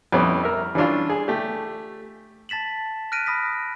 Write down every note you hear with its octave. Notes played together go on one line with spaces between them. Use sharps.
F2 G3 B3 C#4 E4 D5
A#4 E5
E3 G3 C#4 D4 F4
G#4
A3 G4
A5 A6 B6 E7 F#7
F6 F#6 A#6 B6 D7 D#7
B5 D#6 A#6 B6